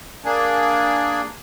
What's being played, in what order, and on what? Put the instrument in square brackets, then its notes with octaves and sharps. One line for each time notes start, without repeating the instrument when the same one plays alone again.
[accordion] A#3 D4 G#4